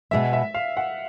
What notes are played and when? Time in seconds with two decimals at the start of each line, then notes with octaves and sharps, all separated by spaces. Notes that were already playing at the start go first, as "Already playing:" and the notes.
0.11 B2 G#3 B3 E5
0.33 E5
0.54 F5
0.77 F#5